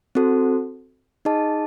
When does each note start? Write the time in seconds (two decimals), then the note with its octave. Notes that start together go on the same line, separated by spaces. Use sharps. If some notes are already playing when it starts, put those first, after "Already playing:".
0.15 C4 F#4 A4 C5
1.25 D#4 G#4 D#5 A5